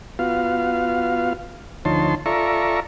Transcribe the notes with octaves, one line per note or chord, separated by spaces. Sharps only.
B3 F4 F#4 F5
D2 F3 D#4 C#5 A5 C6
F4 A4 D5 E5 A#5 C#6